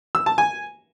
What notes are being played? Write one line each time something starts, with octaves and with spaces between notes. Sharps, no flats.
E6
A5
G#5